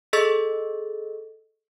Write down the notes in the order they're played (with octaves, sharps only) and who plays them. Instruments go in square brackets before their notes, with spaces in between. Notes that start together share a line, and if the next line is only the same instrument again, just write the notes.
[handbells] G#4 A4 D#5 C#6 E6 A6